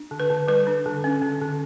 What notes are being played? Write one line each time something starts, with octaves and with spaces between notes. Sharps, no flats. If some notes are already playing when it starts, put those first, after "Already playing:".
Already playing: D4
D3
B4
D3
G3 B4
D4
D3
C#4
D3
D3